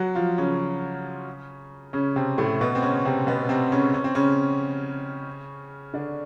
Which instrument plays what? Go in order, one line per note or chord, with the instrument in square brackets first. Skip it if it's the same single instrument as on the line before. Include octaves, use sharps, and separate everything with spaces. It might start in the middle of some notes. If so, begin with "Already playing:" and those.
Already playing: [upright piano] F#3 F#4
F3 F4
C#3 C#4
C#3 C#4
C3 C4
A2 A3
B2 B3
C4
C#3 C#4
C3 C4
B2 B3
C3 C4
C#3 C#4
C#4
C4
C#3 C#4
D3 D4